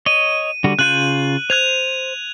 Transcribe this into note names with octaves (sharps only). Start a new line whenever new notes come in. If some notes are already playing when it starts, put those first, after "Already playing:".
C#5 D#5 D#7
D3 G3 F#4
C#3 F4 F#6 G6 D#7 F#7
C5 F#6 G#6 F7